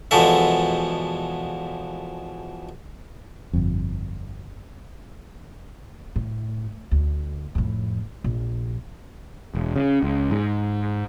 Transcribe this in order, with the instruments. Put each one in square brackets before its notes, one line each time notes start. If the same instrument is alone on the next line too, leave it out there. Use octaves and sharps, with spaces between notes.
[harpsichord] E2 B2 F3 G#3 A4 E5
[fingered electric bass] G1 F2
[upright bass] A2
D2
F2 A2
A#1
[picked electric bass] E1
C#3
C#2
G#2